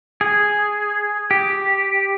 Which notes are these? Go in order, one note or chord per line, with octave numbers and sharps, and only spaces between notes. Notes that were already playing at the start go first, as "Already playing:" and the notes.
G#4
G4